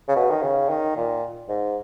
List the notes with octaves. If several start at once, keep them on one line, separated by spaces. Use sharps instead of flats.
C#3
B2
D#3
C#3
D#3
A#2
G#2